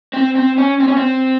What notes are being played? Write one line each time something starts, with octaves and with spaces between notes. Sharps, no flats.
C4
C4
C#4
C4
C#4
C4